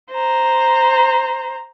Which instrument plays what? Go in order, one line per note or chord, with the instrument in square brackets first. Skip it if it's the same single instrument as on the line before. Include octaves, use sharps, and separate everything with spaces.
[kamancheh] C5 A#5